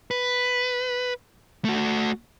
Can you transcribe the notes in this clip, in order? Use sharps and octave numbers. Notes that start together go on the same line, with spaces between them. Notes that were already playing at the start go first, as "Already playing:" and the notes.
B4
A3 F#4